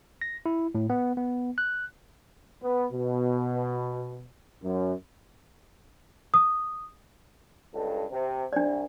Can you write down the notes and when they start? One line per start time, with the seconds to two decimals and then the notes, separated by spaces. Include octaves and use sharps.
0.21 A#6
0.46 E4
0.75 A2
0.90 B3
1.17 B3
1.58 F#6
2.62 B3
2.92 B2
4.63 F#2
6.34 D#6
7.73 C#2 G2 A4
8.10 C3
8.53 C2 D4 D5